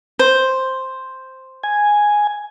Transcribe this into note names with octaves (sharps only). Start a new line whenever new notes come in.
C5
G#5